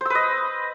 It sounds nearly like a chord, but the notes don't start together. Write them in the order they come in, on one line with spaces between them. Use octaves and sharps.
C5 E6 B4 D#5